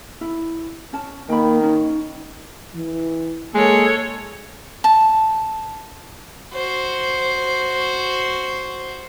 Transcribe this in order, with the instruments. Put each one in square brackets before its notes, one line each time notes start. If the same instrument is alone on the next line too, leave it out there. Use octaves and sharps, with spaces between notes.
[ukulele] E4
C#4 A5
[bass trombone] D#3 [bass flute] A#3 [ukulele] G5 B5
[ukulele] C#4 [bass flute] D#4
[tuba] E3
[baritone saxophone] G#3 [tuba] A#3 [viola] A4 C#5
[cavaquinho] A5
[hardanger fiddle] F#4 C5